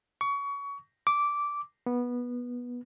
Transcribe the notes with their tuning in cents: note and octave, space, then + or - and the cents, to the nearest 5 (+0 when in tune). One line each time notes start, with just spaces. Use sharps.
C#6 +25
D6 -10
B3 -15